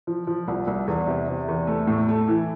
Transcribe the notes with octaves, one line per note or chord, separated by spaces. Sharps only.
F3
F3
C2
C2
E2
C3
C3
E2
A3
A2
A3
E3